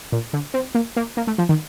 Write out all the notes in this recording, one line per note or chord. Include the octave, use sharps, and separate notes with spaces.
A#2
D3
C4
A#3
A#3
A#3
A3
F3
D#3